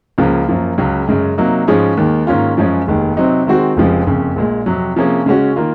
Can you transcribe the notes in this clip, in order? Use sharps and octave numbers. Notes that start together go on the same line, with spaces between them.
C#2 C#3 F3 A#3
F#2 F3 A#3
C#2 C#3 F#3
F#2 C#3 G#3
C3 F#3 A#3 D#4
G#2 F3 G#3 C#4 G#4
D#2 D#3 G#3
G#2 D#3 A#3 C#4 F4
F#2 F3 G#3 C#4 G#4
F1 D#2 D#3 G#3
C3 F#3 C4 D#4
D#3 G#3 C4 F#4 C5
F1 F2 C#3 F3 G#3
F#1 F2 C#3
A#1 A#2 G#3
F2 C3 F#3
C3 F3 A#3 C#4 G#4
C#3 G#3 C#4 F#4
D#3 A#3 F4